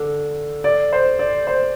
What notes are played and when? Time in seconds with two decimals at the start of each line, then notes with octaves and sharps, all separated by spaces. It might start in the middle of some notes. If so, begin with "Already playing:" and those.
Already playing: D3
0.64 D5
0.93 C5
1.19 D5
1.47 C5